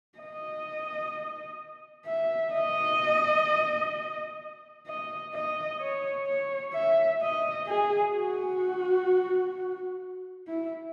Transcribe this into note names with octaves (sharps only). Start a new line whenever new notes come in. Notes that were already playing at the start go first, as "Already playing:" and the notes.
D#5
E5
D#5
D#5
D#5
C#5
C#5
E5
D#5
G#4
F#4
E4